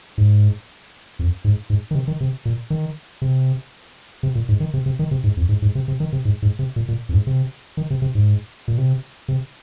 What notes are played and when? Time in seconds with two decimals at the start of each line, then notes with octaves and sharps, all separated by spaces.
0.18 G#2
1.19 F2
1.44 G#2
1.70 G#2
1.91 D#3
1.95 C3
2.08 D#3
2.21 C3
2.45 A#2
2.70 D#3
3.22 C3
4.23 C3
4.35 A#2
4.49 G#2
4.60 D#3
4.74 C3
4.86 C3
4.99 D#3
5.11 C3
5.24 G#2
5.37 F2
5.49 G#2
5.62 G#2
5.75 C3
5.88 C3
6.00 D#3
6.13 C3
6.25 G#2
6.42 G#2
6.59 C3
6.76 A#2
6.88 A#2
7.09 F2
7.14 G#2
7.27 C3
7.77 D#3
7.90 C3
8.02 C3
8.15 G#2
8.68 A#2
8.78 C3
9.28 C3